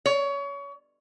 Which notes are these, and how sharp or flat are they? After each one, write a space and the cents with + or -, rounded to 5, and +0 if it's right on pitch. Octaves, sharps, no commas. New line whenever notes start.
C#5 +25